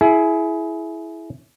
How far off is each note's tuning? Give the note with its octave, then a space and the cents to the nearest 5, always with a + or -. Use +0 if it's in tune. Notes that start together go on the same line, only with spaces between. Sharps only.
E4 +0 G#4 +25